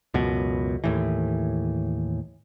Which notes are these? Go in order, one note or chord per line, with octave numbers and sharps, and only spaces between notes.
C#2 F#2 B2
D#2 A2 E3